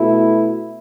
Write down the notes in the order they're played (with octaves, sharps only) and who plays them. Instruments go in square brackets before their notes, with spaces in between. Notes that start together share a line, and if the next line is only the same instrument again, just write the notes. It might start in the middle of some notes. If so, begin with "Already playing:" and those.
Already playing: [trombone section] B2 A3 E4